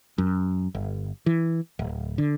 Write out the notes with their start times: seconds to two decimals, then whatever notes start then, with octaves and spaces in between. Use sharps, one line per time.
0.18 F#2
0.75 G1
1.26 E3
1.79 D1
2.18 D3